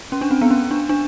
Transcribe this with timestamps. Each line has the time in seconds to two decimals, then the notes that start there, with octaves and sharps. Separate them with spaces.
0.12 C#4
0.21 D4
0.31 C4
0.41 B3
0.51 C#4
0.71 D4
0.89 D4